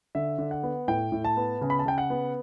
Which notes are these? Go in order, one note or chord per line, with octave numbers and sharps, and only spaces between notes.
D3 E5
D3
F#5
B3
A2 G5
A2
A5
B3
C#3
B5
A5
C#3 G5
F#5
B3